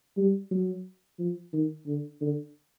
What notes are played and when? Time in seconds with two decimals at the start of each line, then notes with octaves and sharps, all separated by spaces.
0.17 G3
0.51 F#3
1.19 F3
1.53 D#3
1.87 D3
2.21 D3